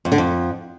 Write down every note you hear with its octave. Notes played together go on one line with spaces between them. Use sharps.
F2
D3
F2